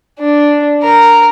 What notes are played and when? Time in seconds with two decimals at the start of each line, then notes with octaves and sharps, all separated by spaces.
0.19 D4
0.83 A#4